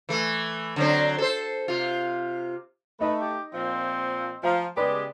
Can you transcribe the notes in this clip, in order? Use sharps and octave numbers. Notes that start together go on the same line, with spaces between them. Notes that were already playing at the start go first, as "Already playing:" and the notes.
E3 A3
D3 F#3 C4
A4 C5
C3 F4
A3 D#4 B4 D#5
G4
A#2 F3 C4
F3 F5 A#5
C#3 G#3 B3 G4 B4 D5